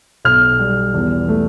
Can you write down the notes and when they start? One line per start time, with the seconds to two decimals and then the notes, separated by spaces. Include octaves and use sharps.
0.25 B1 F6
0.59 G3
0.94 E2
1.28 A3